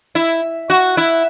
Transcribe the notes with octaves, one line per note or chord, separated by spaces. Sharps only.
E4
F#4
E4